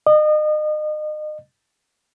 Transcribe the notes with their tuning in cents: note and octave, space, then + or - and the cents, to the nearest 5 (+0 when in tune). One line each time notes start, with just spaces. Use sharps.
D#5 -35